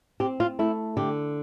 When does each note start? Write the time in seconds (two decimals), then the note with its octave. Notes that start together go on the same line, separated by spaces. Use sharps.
0.20 C4 G4
0.40 F4
0.59 A3 E4
0.97 D3 G4